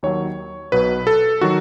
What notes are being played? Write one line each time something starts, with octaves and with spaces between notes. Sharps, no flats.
D#2 D#3 F#3 C#5
B1 B2 F#3 B4
A4
D#3 F#3 F#4